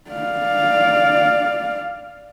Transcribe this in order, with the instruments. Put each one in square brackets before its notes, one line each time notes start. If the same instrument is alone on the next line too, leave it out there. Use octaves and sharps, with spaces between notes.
[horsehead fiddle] D5 F5